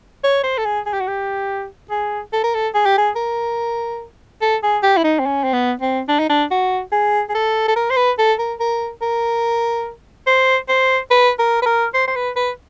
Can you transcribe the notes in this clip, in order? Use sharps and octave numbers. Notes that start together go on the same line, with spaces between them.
C#5
C5
A4
G#4
G#4
G4
F#4
G4
G#4
A4
A#4
A4
G#4
G4
G#4
A#4
A4
G#4
G4
E4
D#4
C4
C#4
C4
B3
C4
D4
D#4
D4
F#4
G#4
G#4
A4
A4
A#4
C5
B4
A4
A#4
A#4
A#4
C5
C5
B4
A#4
B4
A#4
C5
C5
B4
B4